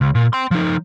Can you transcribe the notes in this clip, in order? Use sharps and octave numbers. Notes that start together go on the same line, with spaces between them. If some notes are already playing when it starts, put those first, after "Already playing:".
C#2
A#2
G5 C6
F3 D#4